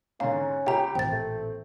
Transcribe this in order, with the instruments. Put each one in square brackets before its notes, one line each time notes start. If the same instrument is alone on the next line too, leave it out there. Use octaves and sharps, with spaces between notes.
[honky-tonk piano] G#2 D3 [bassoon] C#4 [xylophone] F5 A#5
[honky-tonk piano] C#2 G4 [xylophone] G5 A#5
[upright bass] A1 A#2 [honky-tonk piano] C4 [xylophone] G5 A6
[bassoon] A3